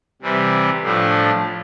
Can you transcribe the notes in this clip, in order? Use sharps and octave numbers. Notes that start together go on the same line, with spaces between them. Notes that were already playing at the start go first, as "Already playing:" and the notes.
C3 E3 G3
A2 F3 A3 D4